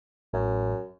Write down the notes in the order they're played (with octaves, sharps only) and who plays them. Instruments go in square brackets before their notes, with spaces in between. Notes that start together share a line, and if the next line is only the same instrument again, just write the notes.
[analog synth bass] A1 [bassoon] F#2